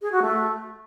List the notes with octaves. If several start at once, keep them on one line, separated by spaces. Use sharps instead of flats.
G#4
F#4
A3